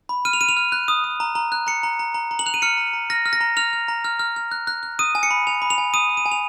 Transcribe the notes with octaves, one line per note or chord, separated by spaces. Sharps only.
B5
F6 D#7
F7
F6 D#7
F7
F6
F#6
D#6
D#6
A#5
A#5
F#6
A#5 C#7
A#5
A#5
A#5
A#5
F#7
F#6 F7
D#7
F6 C#7
A#5
A#5
F6 A#6
F6
A#6
A#5
F6 F7
F6
A#5
F6
F6
F6
F#6
F#6
F#6
D#6 D#7
G#5
C#7
B5
G#5 F7
B5
F7
G#5
D#6 D#7
D#6
D#7
G#5
F7